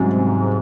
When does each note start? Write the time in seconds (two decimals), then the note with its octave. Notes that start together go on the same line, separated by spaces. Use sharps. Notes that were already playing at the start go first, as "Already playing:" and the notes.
Already playing: C2 G#2 C3 F#3 C#4 F#4
0.16 C3